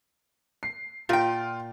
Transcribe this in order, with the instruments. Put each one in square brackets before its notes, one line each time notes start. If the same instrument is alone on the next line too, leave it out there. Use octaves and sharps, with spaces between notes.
[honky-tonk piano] C7
[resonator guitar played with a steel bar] A#2 G5 [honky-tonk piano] F4